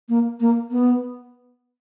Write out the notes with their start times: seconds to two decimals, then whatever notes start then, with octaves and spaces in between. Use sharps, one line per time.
0.09 A#3
0.40 A#3
0.71 B3